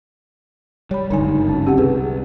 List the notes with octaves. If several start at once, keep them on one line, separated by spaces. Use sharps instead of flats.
G3 C#5 B5
F#1 C#2 G2 D3 D#4 G#5
C#4
C4 G4 F#5
C2 G#4 B4